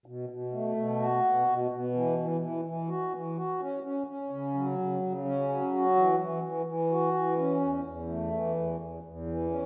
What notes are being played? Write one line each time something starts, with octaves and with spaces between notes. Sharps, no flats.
B2
B2
A3
B2
F#4
B2
B2
B2
E3
E3
E3
E3
F#4
E3
F#4
C#4
C#4
C#4
C#3
F#3
C#3
C#3
C#4
F#3
F#4
E3
E3
E3
E3
F#4
E3
C#4
E2
E2
A3
E3
E2
E2
E2
E3
C#4